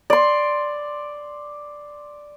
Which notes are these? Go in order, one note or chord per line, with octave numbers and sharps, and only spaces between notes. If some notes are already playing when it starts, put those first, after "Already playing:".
D5 C6